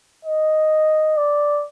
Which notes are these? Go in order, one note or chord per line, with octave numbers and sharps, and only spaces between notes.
D#5
D5